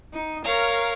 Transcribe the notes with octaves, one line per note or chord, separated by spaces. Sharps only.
D#4
A#4 C#5 F5 A#5